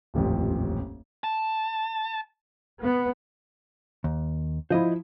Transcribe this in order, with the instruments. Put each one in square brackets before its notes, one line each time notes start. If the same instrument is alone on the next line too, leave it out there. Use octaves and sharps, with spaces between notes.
[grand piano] D#1 A1 F2
[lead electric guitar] A5
[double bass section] B3
[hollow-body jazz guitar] D#2
[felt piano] F3 E4 [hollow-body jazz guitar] C5 D#5